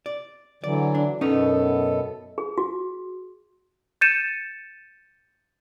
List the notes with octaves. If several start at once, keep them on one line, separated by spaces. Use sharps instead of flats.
D5
D3 E3 F#3 D5
D4
F#2 B2 B3 C#4 D#4 A4
G#4
F#4
G6 A6 C#7 D#7 E7